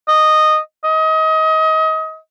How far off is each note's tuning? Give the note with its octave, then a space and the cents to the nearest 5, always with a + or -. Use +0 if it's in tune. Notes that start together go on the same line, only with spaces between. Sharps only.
D#5 -10
D#5 +30